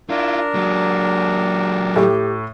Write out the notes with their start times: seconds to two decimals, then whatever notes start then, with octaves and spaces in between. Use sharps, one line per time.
0.10 D4 E4 F4 A#4
0.54 F#3 G#3
1.96 A2 G4